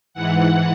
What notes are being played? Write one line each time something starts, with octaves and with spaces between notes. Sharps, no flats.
G#2 E3 F#5